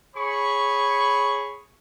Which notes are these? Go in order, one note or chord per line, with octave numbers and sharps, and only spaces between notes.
G#4 C#5 B5 C#6